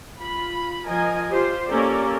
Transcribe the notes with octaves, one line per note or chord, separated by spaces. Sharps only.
F4 B5
F3 A#4 D#5 G#5
F4 G4 C5
A#3 C#4 G4 A4 A#4 D5